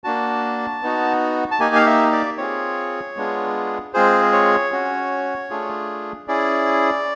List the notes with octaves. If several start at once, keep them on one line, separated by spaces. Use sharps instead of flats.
A#3 D4 F#4 A5
B3 D#4 F#4
A5
A#3 D#4 G4 G#5
F5
E5
D5
C4 F4 G#4 C#5
G#3 B3 D4 F4 G#4
G#3 C4 F4 G#4 C5
C#5
C#4 F#4
A3 D4 F4 G#4
C#4 E4 G#4 D5